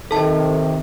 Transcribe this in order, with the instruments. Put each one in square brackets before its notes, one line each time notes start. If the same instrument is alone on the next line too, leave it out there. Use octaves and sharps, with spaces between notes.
[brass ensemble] C3 D#3 [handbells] A4 A5